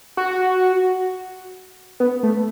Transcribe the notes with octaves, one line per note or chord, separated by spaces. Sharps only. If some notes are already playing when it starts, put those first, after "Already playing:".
F#4
B3
A3